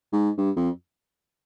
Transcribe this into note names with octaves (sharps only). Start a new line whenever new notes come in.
G#2
G2
F2